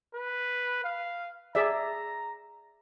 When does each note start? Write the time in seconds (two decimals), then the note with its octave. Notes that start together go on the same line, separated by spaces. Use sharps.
0.14 B4
0.84 F5
1.55 G#4 D5 E5 A#5